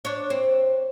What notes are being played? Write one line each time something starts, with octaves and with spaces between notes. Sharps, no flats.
D4 C#5
C4